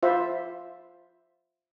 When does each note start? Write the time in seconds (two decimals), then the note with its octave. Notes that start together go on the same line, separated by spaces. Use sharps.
0.03 F4 C5 E5